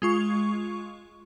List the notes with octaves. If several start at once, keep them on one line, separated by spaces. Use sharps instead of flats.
G#3 F4 C#6